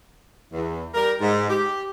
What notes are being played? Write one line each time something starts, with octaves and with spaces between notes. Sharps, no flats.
E2
G3 A#4
G#2
G4